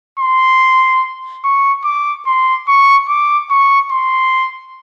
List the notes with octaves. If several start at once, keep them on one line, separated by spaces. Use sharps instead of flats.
C6
C#6
D6
C6
C#6
D6
C#6
C6